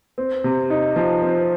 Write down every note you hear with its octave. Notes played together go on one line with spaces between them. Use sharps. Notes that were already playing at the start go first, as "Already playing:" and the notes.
C4
C3
D#4
F3
C4